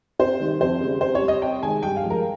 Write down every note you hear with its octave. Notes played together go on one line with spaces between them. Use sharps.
C3 C5
D#3 G3
F2 C5
C#3 G3
C3 C5
C#5
G3
D#5
C3 G5
D#3 G#3 G#5
G2 G5
F5
F3 G#3
A#4